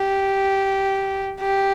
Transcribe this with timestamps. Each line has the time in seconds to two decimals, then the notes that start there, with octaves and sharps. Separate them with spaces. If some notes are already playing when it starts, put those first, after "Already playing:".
Already playing: G4
1.40 G4